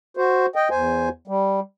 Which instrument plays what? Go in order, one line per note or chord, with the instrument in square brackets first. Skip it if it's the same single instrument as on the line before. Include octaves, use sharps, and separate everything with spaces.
[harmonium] F#4 C5
D#5 G5
E2 C5 G#5
G3